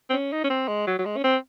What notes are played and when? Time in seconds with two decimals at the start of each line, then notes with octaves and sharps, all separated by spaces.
0.10 C4
0.13 C#4
0.33 D#4
0.44 C#4
0.50 C4
0.68 G#3
0.87 F#3
0.99 F#3
1.06 G#3
1.17 C#4
1.24 C4